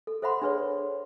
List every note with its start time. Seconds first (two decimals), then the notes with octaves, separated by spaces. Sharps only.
0.07 A4
0.22 A4 C5 E5 F#5 B5 C6
0.42 D4 G#4 B4 C#5